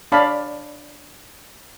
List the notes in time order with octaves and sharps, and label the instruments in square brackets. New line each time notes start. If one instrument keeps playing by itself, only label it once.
[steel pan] D4 C#5 D5 F5 A5 B5